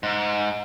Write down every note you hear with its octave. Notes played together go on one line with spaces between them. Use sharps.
G#2